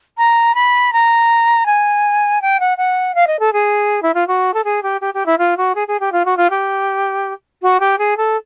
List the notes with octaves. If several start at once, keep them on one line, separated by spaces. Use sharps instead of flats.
A#5
B5
A#5
G#5
G5
F#5
F#5
F5
D#5
A4
G#4
E4
F4
F#4
A4
G#4
G4
G4
G4
E4
F4
F#4
G#4
G#4
G4
F4
F#4
F4
G4
F#4
G4
G#4
A4